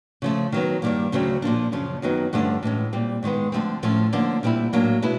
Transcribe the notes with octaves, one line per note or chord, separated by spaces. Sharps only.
C#3 F3 A3
D#3 F#3 B3
G2 D#3 G3 A#3
D2 C#3 F#3 A3 C4
A#2 F3 A#3 D4
F#2 C#3 F3
F#2 D#3 F#3 B3 D#4
G2 D3 F3 A3 C#4
A2 E3 G#3 C#4
A#2 G3 C4
G#2 D#3 G#3 B3
D3 F3 A3 C4
A2 F3 A3 C#4
D3 F3 A#3 C#4
A#2 G3 C4 E4
A2 F#3 A#3 D4
B2 G#3 B3 E4